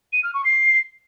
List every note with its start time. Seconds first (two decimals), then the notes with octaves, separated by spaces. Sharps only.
0.13 D#7
0.23 F6
0.34 C#6
0.45 C7